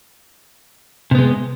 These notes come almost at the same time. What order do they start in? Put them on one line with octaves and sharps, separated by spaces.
C3 B3 G#3